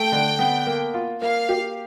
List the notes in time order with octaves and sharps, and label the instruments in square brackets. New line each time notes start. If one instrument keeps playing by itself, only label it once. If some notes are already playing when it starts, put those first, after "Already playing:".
Already playing: [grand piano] A3 [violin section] G5
[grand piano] D3
B3
A#3
F4
[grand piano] A#3 [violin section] F5
[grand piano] G4